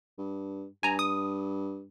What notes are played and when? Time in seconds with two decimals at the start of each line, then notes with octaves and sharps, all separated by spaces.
0.18 G2
0.83 G2 G#5 A#5
0.99 D#6